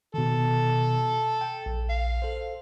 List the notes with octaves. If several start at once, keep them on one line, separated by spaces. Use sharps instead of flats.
B2 D#3 A4
G5
A#1
F5
A4 C5